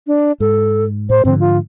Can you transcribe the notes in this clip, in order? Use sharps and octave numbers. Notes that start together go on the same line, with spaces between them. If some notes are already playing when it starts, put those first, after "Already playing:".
D4
G#2 A4
A2 C5
G#2 D3 F3 C4
F4